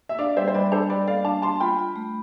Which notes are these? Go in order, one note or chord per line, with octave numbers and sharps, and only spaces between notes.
E5
D4 D5 F5
G3 C5 E5
C5
G3 B4 D5
D4 A4 C5
G3 B4 D5
A4 D5 F5
D4 F5 A5
D4 A5 C6
F4 G5 B5
F4
A3